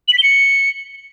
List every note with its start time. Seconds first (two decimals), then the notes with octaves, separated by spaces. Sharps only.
0.08 F#7
0.13 B6
0.18 G7
0.23 C#7